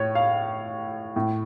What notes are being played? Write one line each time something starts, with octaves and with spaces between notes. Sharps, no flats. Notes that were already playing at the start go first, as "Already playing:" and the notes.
Already playing: A2 C#5
F5
A2